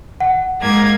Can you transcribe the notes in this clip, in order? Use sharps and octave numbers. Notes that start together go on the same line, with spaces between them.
F#5
G#2 A#3 G#6